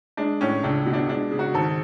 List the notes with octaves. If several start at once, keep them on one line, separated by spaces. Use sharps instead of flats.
G#3 D4
A2 C#4
C#2 D4
B2
D4
G#3 D4
C#3
F#4
G#1 A4